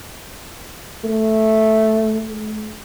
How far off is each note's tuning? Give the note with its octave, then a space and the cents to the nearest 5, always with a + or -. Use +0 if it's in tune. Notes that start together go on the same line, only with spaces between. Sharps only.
A3 -5
A3 -45